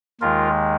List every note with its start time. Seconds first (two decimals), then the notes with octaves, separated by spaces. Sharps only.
0.21 D#2 D#3 G#3 F4 A#4